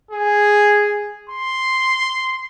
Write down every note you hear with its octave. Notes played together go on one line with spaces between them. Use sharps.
G#4
C6